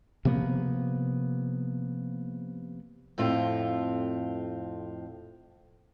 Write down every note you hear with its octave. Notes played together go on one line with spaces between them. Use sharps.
C3 F3 A#3 B3
F2 A2 C4 F4